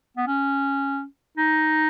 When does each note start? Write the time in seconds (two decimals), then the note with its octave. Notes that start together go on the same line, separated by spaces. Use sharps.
0.17 B3
0.28 C#4
1.37 D#4